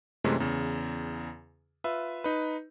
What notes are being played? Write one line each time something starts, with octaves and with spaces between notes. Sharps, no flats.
F#2 C3 E3 G#3 A3 C#4
E2 C#3
F4 B4 E5
D#4 B4